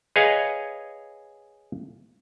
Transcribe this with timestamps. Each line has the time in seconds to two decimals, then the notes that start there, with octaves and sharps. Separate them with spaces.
0.16 G#4 B4 C#5 D#5 F5 G#5